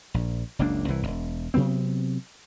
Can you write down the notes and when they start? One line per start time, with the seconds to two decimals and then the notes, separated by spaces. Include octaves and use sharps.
0.14 A#1
0.59 F#1 C#2 A#3 D4
0.88 C2 E3
1.03 E1 C2
1.54 C3 F#3 B3 C4